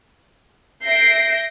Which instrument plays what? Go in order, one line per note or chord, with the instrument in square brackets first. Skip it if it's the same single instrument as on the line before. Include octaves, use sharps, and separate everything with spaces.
[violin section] E5 G6 A#6 C7 D7